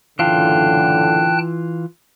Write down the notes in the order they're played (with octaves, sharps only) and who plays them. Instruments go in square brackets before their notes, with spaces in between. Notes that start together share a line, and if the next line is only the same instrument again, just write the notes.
[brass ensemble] F#1 A2 D3 [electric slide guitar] E3 F4 [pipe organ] G5 A5 F#6